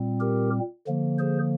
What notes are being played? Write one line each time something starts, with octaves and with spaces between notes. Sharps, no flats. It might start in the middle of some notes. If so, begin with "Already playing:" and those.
Already playing: A#2 G3 C4
G4 A#4
D3 F3 A#3
G#4 C5